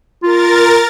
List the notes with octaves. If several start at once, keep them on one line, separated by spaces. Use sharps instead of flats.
F4 A#4 A6